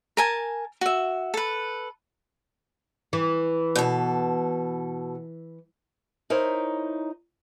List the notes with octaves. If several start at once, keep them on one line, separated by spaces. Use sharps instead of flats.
A#4 G#5 A5
F#4 E5
A4 B4
E3
B2 A4
D#4 E4 A#4 C5 C#5